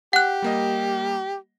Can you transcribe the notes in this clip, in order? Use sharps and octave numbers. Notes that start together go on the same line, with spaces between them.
G4 F#5 F#6
G3 A#3 D#5